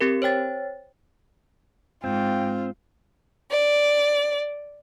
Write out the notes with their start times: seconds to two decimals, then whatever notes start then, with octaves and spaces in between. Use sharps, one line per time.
0.01 C4 G4 A#4
0.22 C5 C#5 G5 A6
2.04 G#2 C4 F4 G5
3.51 D5